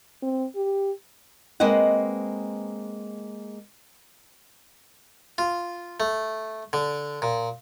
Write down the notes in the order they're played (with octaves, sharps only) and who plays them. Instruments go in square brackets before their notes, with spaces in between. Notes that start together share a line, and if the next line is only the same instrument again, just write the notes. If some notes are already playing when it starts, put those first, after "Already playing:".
[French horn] C4
G4
[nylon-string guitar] G#3 A#3 C4 B4 D#5 F#5
[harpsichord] F4
A3
D3
A#2